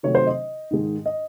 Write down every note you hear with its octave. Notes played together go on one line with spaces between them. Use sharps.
C3 D#3 F#3 A3 C#5
C5
D#5
G#2 D#3 G#3
D#5